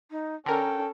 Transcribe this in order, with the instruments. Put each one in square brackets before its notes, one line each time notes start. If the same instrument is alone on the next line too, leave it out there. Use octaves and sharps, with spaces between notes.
[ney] D#4
[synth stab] D3 A#4 [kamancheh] C#4 A4 [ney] G5